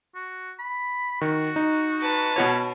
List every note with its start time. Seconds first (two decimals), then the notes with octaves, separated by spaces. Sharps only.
0.15 F#4
0.59 B5
1.21 D#3 F#4
1.56 D#4
2.01 B4 A5
2.36 B2 C#4 F#4 C#5